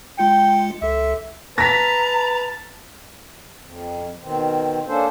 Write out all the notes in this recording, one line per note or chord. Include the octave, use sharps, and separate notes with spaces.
G#3 F4 G5 C#7
C#2 A4 E5
B4 A5 A#5 A#6 B6
F2
B2 D#3 C4
A#3 C#4 D4 A4 C5